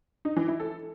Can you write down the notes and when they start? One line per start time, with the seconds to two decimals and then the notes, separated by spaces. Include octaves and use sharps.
0.25 D#4
0.36 E3
0.48 E4
0.60 A4